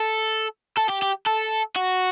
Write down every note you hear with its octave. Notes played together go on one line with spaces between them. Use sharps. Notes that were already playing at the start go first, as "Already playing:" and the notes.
Already playing: A4
A4
G4
G4
A4
F#4